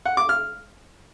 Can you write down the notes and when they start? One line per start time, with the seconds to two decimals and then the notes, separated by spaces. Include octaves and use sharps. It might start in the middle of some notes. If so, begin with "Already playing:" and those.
0.06 F#5
0.17 D6
0.29 F6